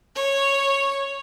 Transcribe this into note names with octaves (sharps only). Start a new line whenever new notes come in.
C#5